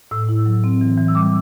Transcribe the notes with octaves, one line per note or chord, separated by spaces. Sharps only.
A2 E6
E4
F#3
C4
E3
E3
E6
G3 D6